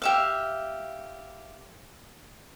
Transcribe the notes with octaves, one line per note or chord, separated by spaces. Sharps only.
G4 E5 F5